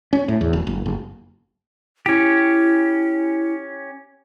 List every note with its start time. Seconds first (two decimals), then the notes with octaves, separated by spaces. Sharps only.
0.13 C#4
0.28 A2
0.41 E2
0.53 E1
0.67 F#1
0.86 F#1
2.06 C#4 E4 G4